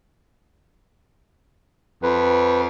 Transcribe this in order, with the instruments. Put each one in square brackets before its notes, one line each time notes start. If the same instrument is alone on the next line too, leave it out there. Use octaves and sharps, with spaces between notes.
[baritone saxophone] F2 [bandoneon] B4